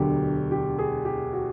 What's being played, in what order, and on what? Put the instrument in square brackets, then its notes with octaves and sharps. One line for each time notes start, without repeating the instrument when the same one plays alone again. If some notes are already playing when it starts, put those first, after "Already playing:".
Already playing: [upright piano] E1 D2 D3 F#3 G4
G4
G#4
G4
F#4